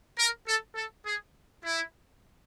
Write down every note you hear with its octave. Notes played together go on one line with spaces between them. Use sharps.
A#4
A4
A4
G#4
E4